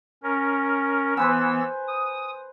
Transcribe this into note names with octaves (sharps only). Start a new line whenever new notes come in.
C#4 A#4
E3 B3 B4 C5 G#5 E6
D#6